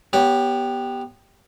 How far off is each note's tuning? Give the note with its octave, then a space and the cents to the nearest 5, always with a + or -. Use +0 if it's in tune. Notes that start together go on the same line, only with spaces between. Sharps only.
B3 -15 G4 +0 C#5 +20